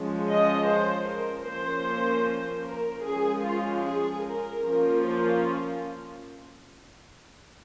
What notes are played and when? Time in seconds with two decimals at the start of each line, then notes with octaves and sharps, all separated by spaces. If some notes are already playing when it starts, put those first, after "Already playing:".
Already playing: F3 G#3 C#4
0.26 D#5
0.65 C5
1.05 A#4
1.44 F3 A#3 C#4 C5
2.63 A#4
3.03 F3 G#3 C#4 G#4
3.42 F4
3.82 G#4
4.22 A#4
4.61 F3 A#3 C#4
5.01 F4